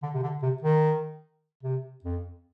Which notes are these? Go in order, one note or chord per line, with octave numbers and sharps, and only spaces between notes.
D3
C3
D3
C3
D#3
C3
F2